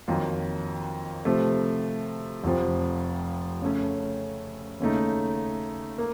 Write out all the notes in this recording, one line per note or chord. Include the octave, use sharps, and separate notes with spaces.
F2 D#3 F#3 A#3 F4
C3 F3 A3
F1 F2 C3 F3
C#3 A3 C#4
D#2 C#3 A3 D#4
A#3